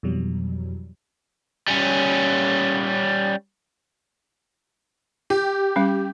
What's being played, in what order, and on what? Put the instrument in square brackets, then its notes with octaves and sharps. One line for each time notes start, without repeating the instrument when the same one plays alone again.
[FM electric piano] F2 B2 E3 F#3 G3
[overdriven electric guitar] G3 C#4
[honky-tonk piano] G4
[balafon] G3 C#4